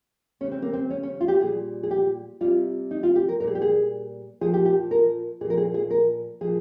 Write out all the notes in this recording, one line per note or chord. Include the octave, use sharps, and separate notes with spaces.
C#3 G3 C#4
C4
A#3
C4
C#4
C#4
F4
G4
A#2 G3 G#4
G#4
G4
C3 G3 F4
D#4
F4
G4
A#4
A#2 G3 A#4
G#4
G4
G#4
A#2 F3 G#4
G4
G4
A#4
A#2 F3 G#4 A#4
G#4
G#4
A#4
A#2 F3 G#4